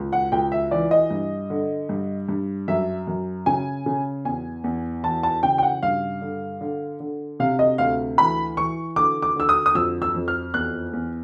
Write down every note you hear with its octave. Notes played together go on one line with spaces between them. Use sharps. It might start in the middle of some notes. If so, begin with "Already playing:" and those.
Already playing: C#2
F#5
C#2 G5
E5
E3 D5
D#5
G2
D3
G2
G2
F#2 E5
F#2
C#3 G#5
C#3
E2 G#5
E2
E3 A5
A5
C#3 G5
G5
F#5
G2 F5
D3
D3
D3
C3 F5
D#5
D2 F5
E3 B5
E3 C#6
D3 D6
D6
D3 E6
D#6
D#6
F2 E6
E6
F2
F6
E2 F#6
E2